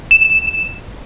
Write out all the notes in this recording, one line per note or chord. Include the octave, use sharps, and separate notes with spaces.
E7